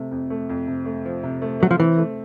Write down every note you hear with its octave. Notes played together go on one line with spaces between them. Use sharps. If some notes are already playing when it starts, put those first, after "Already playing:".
Already playing: C3 A3
F2
A3
F2
C3
A3
F3
C3
A3
F#3 A3
F3
E3 C4
A3